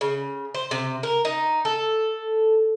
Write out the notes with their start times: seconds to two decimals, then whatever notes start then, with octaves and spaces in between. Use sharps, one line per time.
0.01 C#3
0.55 C5
0.71 C3
1.03 A#4
1.25 D#4
1.65 A4